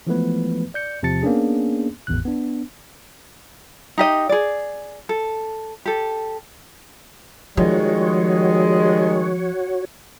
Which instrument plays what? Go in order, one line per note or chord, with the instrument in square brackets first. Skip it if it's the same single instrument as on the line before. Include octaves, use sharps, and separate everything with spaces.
[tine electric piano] E3 F3 G#3 A3 B3 B4
D5 G6 C#7
E2 C3 F3 A5 A6 C#7
A#3 B3 C#4 D4 G#4
G#1 E2 A2 F#6
B3 D4
[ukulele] D#4 G4 D#5
G#4 D5
A4
G4 A4
[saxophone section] D#3 G3 G#3 [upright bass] F3 [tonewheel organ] F#4 C#5